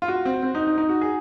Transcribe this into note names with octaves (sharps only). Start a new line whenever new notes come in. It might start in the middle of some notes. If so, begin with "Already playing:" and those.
F4
F#4
C4
C4
D#4
D#4
D#4
F#4
G#4